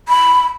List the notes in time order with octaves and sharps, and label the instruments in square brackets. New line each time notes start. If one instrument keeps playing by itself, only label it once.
[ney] B5